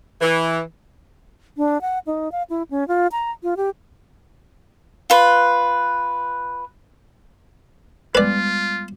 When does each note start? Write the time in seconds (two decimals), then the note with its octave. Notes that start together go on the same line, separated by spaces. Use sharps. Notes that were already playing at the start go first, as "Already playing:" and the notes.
0.22 E3
1.57 D4
1.81 F#5
2.07 D#4
2.32 F5
2.50 E4
2.71 C#4
2.88 F4
3.12 A#5
3.43 F4
3.57 G4
5.10 F4 B4
8.15 G3 G#3 B3 F4 B4 D5